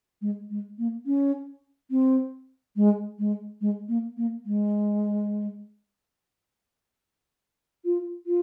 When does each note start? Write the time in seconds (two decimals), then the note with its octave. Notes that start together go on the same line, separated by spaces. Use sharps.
0.21 G#3
0.50 G#3
0.78 A#3
1.06 C#4
1.91 C4
2.76 G#3
3.19 G#3
3.61 G#3
3.88 A#3
4.17 A#3
4.45 G#3
7.85 F4
8.26 F4